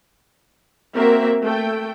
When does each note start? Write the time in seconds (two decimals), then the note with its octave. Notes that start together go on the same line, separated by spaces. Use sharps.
0.94 A#3 C4 F#4 A#4 E5
1.44 A3 A4 G5